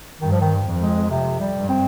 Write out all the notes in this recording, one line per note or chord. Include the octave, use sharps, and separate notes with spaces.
G2 D#3
F3
D#3
F2
G#3
C3
G3
G2
C4